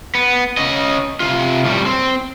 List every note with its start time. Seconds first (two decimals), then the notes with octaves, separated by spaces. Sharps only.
0.15 B3
0.57 C#4 D#5
1.20 C3 F4
1.65 A2 G3
1.86 C4